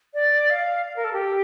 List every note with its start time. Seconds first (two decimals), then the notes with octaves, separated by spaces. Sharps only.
0.14 D5
0.50 F5
0.86 F5
0.96 A#4
1.04 A4
1.13 G4